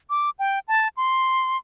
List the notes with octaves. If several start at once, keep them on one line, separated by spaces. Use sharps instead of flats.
D6
G5
A5
C6